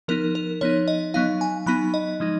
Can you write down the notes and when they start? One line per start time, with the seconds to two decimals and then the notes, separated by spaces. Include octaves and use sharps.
0.08 F3 B3 D#4 A#4
0.35 A#4
0.61 F3 B3 D#4 C#5
0.88 D#5
1.14 F#3 B3 D#4 F5
1.41 G#5
1.66 F#3 B3 D#4 B5
1.94 D#5
2.20 F3 G#3 D#4